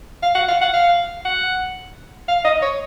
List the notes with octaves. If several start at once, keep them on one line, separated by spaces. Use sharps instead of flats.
F5
F#5
F5
F#5
F5
F#5
F5
D#5
C#5